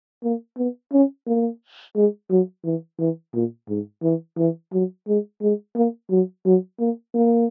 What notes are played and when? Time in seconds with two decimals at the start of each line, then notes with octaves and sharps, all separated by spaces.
0.24 A#3
0.57 B3
0.93 C#4
1.27 A#3
1.96 G#3
2.30 F#3
2.65 E3
2.99 E3
3.34 A#2
3.69 G#2
4.03 E3
4.38 E3
4.73 F#3
5.07 G#3
5.42 G#3
5.76 A#3
6.11 F#3
6.46 F#3
6.80 A#3
7.14 A#3